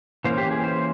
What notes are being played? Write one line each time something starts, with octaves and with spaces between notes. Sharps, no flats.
E3 A#3 C#4 C5
G4
G#4
C5